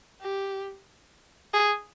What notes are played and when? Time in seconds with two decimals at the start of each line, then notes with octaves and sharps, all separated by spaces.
0.21 G4
1.53 G#4